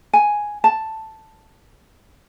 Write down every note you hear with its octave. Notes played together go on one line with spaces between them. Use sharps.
G#5
A5